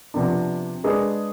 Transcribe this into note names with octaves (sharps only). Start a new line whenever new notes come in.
C3 F3 B3 D4
G#3 D4 G#4 B4